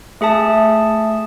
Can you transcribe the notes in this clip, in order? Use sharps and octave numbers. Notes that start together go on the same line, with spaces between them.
A3 G#4 E5 A5